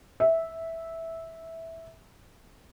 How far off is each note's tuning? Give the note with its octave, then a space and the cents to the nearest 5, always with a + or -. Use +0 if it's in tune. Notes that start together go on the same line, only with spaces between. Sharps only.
E5 -10